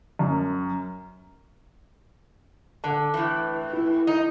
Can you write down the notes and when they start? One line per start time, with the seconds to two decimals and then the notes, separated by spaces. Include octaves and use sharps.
0.19 F#2
2.84 D3 A5
3.14 A2 E3
3.73 E4
4.07 D#4